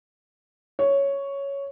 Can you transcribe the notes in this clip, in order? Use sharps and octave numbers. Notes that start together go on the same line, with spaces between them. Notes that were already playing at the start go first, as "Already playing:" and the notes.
C#5